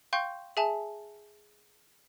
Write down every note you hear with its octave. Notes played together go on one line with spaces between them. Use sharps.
F5 G5 C6 C#6 G6
G#4 E5 G#5 A5